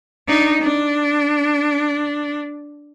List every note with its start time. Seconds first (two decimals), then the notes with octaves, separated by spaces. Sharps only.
0.28 D4 D#4
0.62 D4